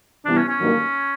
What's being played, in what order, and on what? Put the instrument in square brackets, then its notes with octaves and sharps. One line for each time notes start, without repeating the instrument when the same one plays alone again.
[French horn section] C3 E3 G3 B3 E4 [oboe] D4
[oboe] C#4
C#4
[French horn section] G2 D#3 F#3 A#3